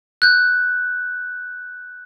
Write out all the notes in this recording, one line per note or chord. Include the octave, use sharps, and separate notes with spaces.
F#6 G6